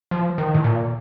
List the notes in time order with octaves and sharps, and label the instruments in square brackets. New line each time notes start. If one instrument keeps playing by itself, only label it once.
[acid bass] F3
D#3
A2
A#2